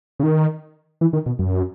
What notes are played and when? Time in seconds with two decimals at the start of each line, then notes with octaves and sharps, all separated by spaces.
0.19 C#3
0.23 D#3
1.01 E3
1.13 D#3
1.26 B2
1.39 F#2